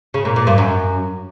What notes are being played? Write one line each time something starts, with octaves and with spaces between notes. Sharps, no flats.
C#3
A#2
A#2
G2
F#2